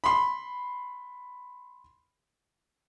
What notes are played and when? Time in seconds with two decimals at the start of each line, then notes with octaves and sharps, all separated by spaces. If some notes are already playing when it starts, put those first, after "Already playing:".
0.04 B5 C6